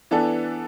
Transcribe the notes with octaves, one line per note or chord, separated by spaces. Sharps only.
E3 B3 D4 A4